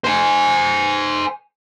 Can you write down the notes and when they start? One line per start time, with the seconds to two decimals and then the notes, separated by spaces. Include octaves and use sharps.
0.04 C5 G#5